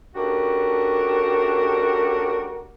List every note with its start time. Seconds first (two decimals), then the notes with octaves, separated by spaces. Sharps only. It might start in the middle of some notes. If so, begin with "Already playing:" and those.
0.15 A3 C#4 D4 F#4 G4 A#4